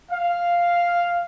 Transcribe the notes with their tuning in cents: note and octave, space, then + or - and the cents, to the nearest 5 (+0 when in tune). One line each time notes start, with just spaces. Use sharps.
F5 +0